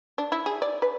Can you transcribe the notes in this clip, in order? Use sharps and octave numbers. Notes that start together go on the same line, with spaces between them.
D4
E4
G#4
D5
B4